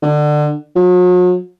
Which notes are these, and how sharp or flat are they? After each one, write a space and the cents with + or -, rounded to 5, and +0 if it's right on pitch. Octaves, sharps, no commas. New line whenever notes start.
D3 +25
F#3 -45